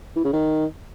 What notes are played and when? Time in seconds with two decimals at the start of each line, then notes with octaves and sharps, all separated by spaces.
0.16 E3
0.25 C#3
0.33 D#3